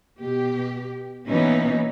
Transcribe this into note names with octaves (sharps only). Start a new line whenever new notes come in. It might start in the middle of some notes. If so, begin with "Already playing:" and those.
B2 G4
B2 E3 A#3 B3 C#4 D#4